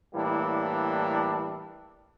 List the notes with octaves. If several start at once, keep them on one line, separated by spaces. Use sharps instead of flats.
A2 E3 G3 A#3 D4